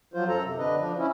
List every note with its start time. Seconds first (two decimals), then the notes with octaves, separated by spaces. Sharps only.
0.14 F3 F#3 F4 C5
0.28 F#2 A4 A#5
0.43 C3
0.58 D3 D4 B4 D#5
0.76 F3 D4
0.98 C#4 E4